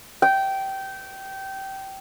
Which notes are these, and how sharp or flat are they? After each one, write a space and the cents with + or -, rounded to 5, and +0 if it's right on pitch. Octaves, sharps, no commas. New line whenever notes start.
G5 -20